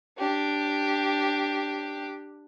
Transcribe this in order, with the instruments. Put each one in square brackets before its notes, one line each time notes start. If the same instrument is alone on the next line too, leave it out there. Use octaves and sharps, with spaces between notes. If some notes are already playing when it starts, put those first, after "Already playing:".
[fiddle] D4 G4